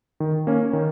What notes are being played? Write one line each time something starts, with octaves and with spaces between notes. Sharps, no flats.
D#3
A#3 C#4
D#3